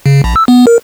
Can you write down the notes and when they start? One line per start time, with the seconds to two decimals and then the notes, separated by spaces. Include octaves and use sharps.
0.06 C#3
0.24 A#1
0.36 E6
0.48 B3
0.67 A#4